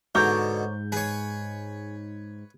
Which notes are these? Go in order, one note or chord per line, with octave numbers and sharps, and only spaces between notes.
G#2 B2 D3 C#5 A#5 D6 G6
G#4 B4 C#5